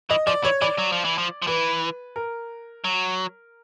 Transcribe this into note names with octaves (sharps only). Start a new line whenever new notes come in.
E3 D#5
F3 D5
E3 C#5
E3 D5
F#3
F3
E3
F3
F3
E3 B4
A#4
F#3